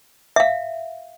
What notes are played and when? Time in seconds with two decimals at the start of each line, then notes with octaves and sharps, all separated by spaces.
0.36 E5 F5